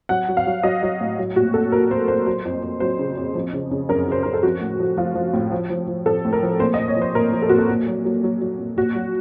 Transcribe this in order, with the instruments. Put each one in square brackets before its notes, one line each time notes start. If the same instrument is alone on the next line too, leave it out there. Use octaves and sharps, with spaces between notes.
[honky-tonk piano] F#3 F#5
F#3
F5
F#3
F#3 D#5
F#3
A2
F#3
A#2 F#4
A#2 A4
A#2 A#4
A#2 C5
A#2 C5
F#3 C5
F2
F2
F#3 C5
C#3
F2
F3
C#3
C#3
F#2 A#4
C#3 C5
F#2 A#4
A4
F3 F#4
A2
F3
F3 F4
F3
A2
F3
F3
F3
F3 A4
A2
A#4
F3
A#2 C5
D#5
A#2
C#5
F3
C5
A#2 A#4
F3
A4
A#2 F#4
A4
A#2
F#3
F#3
F#3
F#3
A#2
A#2 F#4
F#3